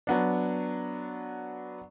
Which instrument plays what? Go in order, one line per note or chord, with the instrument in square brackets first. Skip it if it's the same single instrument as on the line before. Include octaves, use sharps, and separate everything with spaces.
[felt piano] F#3 B3 D4